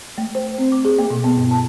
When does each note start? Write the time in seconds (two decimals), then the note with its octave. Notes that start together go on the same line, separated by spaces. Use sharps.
0.18 A3
0.35 C5
0.58 C4
0.72 D6
0.85 G#4
0.99 A#3
1.10 B2
1.24 B3
1.37 G2
1.51 A5